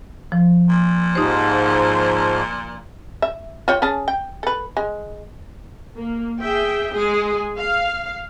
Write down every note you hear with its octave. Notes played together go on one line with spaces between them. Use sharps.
F3
A#2
G#2 F3 D#4 G4 C5
E5
F4 C#5 G5
C#4 G#4 A5
G5
A4 B4
G#3
A#3
G#4 E5 G5
G#3 G#4
F5